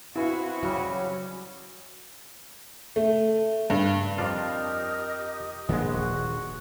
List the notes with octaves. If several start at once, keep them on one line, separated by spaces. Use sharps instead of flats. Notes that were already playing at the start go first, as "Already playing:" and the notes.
C4 E4 F#4 G#4 B4 F5
C#3 F#3 G3 G#4
A3
G2
F2 D4 F4 G4 A#4 D#5 D#6
A#1 D#3 F3 G#3 A#3 B3
D#1 F#4